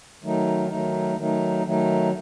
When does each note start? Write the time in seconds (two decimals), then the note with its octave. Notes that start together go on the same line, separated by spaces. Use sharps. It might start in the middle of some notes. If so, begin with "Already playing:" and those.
0.23 D#3 F#3 A3 D#4
0.69 D#3 F#3 A3 D#4
1.16 D#3 F#3 A3 D#4
1.64 D#3 F#3 A3 D#4